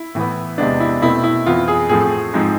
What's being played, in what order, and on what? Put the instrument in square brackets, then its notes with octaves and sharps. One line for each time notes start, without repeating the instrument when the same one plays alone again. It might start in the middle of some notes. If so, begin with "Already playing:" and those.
Already playing: [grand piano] E4
A2 E3 B3
E2 C3 G#3 B3 D4
E4
B2 A3 C4 E4
E4
F2 E3 B3 F4
G#4
A2 F3 A3 C4 G#4
G#2 F3 G#3 C4